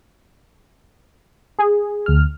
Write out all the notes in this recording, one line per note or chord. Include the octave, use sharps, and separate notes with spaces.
G#4
D2 F6